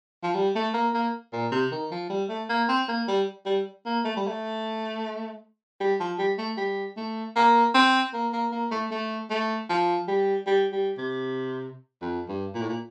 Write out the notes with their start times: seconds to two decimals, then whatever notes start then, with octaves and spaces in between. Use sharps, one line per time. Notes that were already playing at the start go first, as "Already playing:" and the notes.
0.23 F3
0.35 G3
0.55 A3
0.74 A#3
0.94 A#3
1.33 A#2
1.52 C3
1.72 D#3
1.91 F3
2.10 G3
2.29 A3
2.50 A#3
2.69 C4
2.89 A#3
3.08 G3
3.46 G3
3.86 A#3
4.04 A3
4.17 G3
4.27 A3
5.80 G3
6.00 F3
6.19 G3
6.38 A3
6.57 G3
6.97 A3
7.36 A#3
7.75 C4
8.14 A#3
8.33 A#3
8.52 A#3
8.71 A3
8.91 A3
9.30 A3
9.69 F3
10.08 G3
10.47 G3
10.72 G3
10.98 C3
12.02 F2
12.28 G2
12.54 A#2
12.61 A2
12.69 A#2